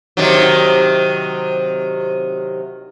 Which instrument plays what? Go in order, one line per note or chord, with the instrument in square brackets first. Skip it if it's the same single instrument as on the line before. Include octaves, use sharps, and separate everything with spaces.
[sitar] C3 D#3 F#3